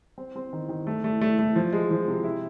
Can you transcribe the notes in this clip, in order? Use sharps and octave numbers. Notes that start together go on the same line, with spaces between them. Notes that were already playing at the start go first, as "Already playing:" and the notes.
C4
C4
D#3
D#3
A3
A3
A3
A3
F3
G#3
F3
C3
E4